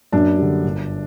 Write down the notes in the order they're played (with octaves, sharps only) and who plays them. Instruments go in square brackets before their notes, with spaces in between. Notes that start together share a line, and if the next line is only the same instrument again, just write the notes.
[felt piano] F#2 D4
D3 G3
G1